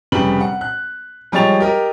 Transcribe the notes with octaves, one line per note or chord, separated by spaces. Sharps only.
F1 C#3 G3 B4 B5 F#7
F#5
F#6
F3 G3 G#3 C#5 A6 F7
G4 A#4 D#5